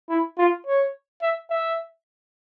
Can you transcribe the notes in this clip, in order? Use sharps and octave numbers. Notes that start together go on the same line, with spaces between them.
E4
F4
C#5
E5
E5